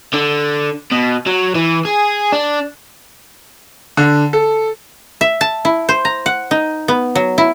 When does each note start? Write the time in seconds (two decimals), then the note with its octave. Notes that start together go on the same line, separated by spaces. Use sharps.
0.14 D3
0.92 B2
1.27 F#3
1.55 E3
1.85 G#4
2.32 D4
3.97 D3
4.33 A4
5.21 E5
5.41 A5
5.65 E4
5.89 C5
6.05 A#5
6.26 F#5
6.51 D#4
6.88 B3
7.15 F#3
7.38 E4